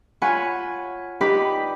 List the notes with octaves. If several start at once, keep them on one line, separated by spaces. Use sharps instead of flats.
F4 C#5 F#5 G#5 B5
D#4 G4 B4 D5 B5